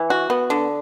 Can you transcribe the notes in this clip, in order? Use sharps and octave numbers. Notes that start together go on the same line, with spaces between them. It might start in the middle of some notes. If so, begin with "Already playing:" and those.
Already playing: E3
F#4
B3
D3